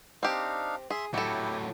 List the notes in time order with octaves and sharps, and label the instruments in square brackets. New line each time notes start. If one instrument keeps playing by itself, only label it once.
[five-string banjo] C4 G4 [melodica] D4 D#4 F5
[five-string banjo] G#4 [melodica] E5 C6
[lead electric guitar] A2 F#3 [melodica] E4 G4 [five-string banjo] F#4 A4